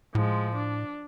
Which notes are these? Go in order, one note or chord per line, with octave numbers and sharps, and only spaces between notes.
A2 F3 G#3
D4